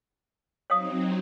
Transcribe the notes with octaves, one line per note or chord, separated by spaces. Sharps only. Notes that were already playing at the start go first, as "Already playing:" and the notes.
F#3 C4 D#4 C#5 F5 D#6